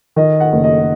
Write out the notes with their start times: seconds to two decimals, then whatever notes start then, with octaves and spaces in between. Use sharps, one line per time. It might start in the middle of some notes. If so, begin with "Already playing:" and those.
0.16 D#3 D#5
0.40 F#5
0.53 F#1
0.64 D#5